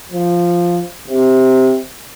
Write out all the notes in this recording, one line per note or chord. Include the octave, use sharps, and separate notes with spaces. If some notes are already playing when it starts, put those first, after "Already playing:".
F3
C3